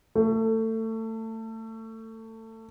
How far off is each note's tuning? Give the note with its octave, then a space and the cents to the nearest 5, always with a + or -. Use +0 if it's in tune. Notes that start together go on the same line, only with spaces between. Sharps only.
A3 +25